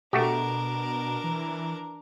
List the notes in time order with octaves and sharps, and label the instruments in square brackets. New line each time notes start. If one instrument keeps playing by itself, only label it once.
[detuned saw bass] B2 [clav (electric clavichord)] A3 F#4 G4 [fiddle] D4 A#4
[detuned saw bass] E3